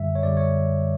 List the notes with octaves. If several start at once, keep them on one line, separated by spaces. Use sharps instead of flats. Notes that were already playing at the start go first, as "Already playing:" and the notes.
Already playing: F#2 D3 G3 E5
C#5
F#2 D3 G3 D5
C#5